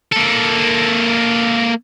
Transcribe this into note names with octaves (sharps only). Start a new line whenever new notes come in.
A#3 A4